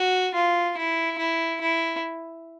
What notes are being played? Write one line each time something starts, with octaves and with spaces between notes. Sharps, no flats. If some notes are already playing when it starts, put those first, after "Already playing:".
Already playing: F#4
F4
E4
E4
E4